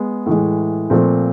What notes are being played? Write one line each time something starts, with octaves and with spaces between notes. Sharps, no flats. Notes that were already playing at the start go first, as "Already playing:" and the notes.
Already playing: G#3 B3
A2 E3 G#3
A#2 F3 A3 C4